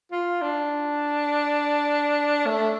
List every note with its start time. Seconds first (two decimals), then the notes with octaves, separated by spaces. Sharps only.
0.11 F4
0.42 D4
2.46 A3